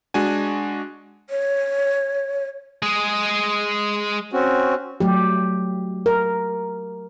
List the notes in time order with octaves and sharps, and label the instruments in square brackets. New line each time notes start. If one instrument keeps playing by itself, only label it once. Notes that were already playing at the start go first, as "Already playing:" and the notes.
[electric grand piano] G#3 D4 F#4 G#5
[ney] C#5
[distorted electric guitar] G#3 G#4
[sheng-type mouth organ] C4 C#4 F#4
[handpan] F#3 A3 G4
A#4